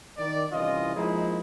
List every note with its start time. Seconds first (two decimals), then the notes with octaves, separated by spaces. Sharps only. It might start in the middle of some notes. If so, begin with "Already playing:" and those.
0.18 D#3 D5
0.52 C2 E3 C#4 F4 D#5
0.95 F3 G#3 A#3 D#4 E4 G#4